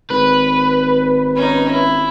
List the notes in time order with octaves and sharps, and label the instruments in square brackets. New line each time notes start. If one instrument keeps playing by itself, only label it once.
[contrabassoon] G#1 [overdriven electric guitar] B4
[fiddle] C#4 D#4
E4